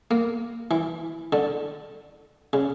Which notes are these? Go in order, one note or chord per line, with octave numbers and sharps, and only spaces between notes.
A#3
E3
D3
C#3